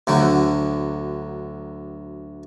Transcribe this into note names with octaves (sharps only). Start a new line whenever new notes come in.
D2 D3 F#3